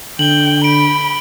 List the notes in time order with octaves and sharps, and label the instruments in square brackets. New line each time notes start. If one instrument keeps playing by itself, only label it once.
[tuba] D3 [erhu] G5 [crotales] F#7 G7
[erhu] B5 [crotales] D7